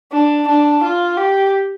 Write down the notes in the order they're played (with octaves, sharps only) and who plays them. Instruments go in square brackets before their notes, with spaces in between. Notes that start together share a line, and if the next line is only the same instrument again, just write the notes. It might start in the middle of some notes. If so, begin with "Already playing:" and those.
[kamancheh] D4
D4
F4
G4